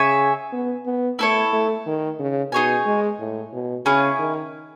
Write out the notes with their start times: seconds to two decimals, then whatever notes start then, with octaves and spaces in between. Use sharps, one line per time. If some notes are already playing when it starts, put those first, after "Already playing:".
Already playing: C#3 G#4 C#5 E5 G#5
0.53 B3
0.86 B3
1.19 A3 E4 A4 C#5
1.53 A3
1.86 D#3
2.19 C#3
2.52 B2 D#4 G#4 C#5 G#5
2.86 G#3
3.19 A2
3.53 B2
3.86 C#3 C#4 E4 G#4
4.19 D#3